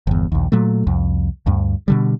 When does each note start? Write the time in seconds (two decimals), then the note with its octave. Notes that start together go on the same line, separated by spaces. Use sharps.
0.07 G1 E2
0.32 A#1 D#2
0.52 A#2 F#3 A3
0.87 C2 F2
1.46 D2 G2
1.88 B2 D3 G3